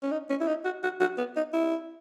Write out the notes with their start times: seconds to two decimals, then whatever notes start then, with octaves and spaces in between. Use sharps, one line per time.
0.03 C#4
0.12 D#4
0.30 C#4
0.41 E4
0.48 D#4
0.65 F#4
0.83 F#4
1.00 F#4
1.18 B3
1.36 D#4
1.54 E4